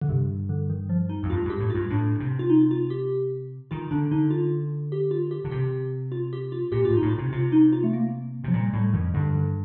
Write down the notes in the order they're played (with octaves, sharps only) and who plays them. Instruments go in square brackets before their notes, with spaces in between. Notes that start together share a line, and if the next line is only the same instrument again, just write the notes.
[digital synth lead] D3
[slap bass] G2 [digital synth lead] C3
[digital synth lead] D3
D#3
F3
D#4
[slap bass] F2
[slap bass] G2 [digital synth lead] F4
[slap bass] G2 [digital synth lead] G4
[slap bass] A2
[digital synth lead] F4
[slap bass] G2
[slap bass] A2 [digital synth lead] D4
[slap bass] C3
[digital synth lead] F4
D#4
F4
G4
[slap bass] D#3 [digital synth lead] F4
[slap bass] D3 [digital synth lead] D4
[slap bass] D3 [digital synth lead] D#4
[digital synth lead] F4
G4
F4
G4
[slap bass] D3
[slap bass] C3 [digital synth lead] G4
[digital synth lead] F4
G4
F4
[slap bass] A#2 [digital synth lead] G4
[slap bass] A2 [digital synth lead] F4
[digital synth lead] D#4
[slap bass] A2
[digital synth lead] F4
[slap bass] C3
[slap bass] C3 [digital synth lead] F4
[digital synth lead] D#4
F4
A3
A#3
[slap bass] C3
[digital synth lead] F3
[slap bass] A#2 [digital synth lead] G3
[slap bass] A2 [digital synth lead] G3
[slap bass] F2 [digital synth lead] D#3
[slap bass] G2 [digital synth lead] D3
[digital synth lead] D3